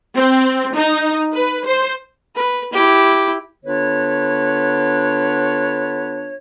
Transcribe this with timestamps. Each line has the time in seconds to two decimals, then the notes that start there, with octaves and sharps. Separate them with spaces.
0.15 C4
0.74 D#4
1.33 B4
1.66 C5
2.35 B4
2.72 E4 G4
3.65 D3 B3 D4 F4 B4 C#5